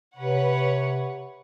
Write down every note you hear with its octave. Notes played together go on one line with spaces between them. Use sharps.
C3 B4 C#5 F#5